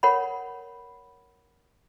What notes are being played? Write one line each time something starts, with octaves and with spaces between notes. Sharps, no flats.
A#4 C#5 F#5 B5